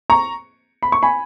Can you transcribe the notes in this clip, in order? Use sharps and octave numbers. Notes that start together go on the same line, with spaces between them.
A#5 C#6
B5
C#6
G#5 B5